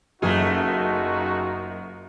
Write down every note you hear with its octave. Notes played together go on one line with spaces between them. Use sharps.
F#1 F#2 A3 D#4 F4 F#4 G#4